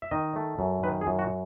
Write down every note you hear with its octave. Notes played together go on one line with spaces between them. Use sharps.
E5
D#3 D#5
A3
F#2
D#3 B4
G#4
F#2
F#4